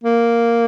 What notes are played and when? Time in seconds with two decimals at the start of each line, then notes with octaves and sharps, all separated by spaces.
0.03 A#3